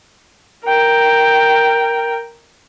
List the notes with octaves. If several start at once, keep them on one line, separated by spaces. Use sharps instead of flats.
A#4 G5